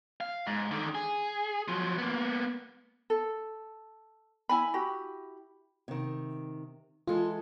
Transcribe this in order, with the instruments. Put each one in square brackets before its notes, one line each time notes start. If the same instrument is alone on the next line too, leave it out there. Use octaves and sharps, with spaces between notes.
[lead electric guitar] F5
G#2
D3 D#3
G#4
F3 F#3
A#3 B3
[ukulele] A4
E4 G#5 B5
E4 F#4 G4 B5
[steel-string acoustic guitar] C3 D#3
[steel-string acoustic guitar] E3 G#3 A4 [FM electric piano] F4